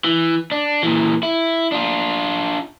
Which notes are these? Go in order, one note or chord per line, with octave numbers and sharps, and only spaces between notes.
E3
D4
A#2 E3
E4
D4 F4